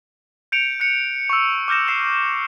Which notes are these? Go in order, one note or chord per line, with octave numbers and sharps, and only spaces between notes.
G6 C#7 D7 F7
F#6 C#7
C#6 E6
D6 F6 G6 A#6 E7
E6 C7 E7